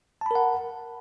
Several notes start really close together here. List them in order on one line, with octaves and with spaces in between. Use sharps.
A5 B5 A#4 F#5